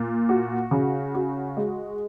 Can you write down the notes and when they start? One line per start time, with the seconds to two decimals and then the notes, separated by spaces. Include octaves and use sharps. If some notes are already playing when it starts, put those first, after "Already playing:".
Already playing: A#2
0.29 F#4
0.71 C#3
1.15 F#4
1.57 G#3